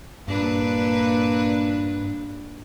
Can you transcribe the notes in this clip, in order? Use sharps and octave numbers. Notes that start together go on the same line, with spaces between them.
G2 A#2 D4 B4